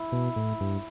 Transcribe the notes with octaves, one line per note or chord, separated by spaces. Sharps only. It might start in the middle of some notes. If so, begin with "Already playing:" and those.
Already playing: E4
B2
A2
G2